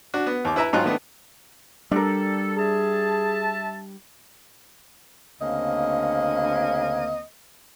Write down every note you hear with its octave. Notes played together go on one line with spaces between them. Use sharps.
D4 F#4
B3
D#2 D6
E4 B4 E5 A#5
G#1 G#2 F#3 D#4 F4 F#6
D#3 A3 B3 D4
G3 D4 A4 A#4
G#4 E5 A5
D2 C#3 A#3 C4 D#5